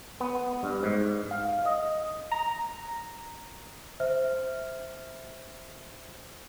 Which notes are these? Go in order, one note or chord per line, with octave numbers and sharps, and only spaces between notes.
B3
G2
G#2
F5
D#5
A#5
C5 E5 F6